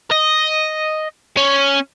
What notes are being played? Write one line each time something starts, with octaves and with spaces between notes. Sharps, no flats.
D#5
C#4